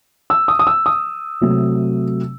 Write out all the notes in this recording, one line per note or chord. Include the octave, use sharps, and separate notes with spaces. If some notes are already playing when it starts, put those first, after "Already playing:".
E6
D#6
D#6
E6
D#6
C3 F#3 A3